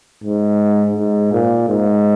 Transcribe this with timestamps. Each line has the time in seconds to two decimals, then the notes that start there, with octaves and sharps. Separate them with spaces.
0.24 G#2
0.96 G#2
1.33 A#2
1.69 G#2